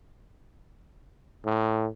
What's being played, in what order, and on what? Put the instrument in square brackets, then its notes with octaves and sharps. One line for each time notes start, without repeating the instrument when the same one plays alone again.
[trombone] A2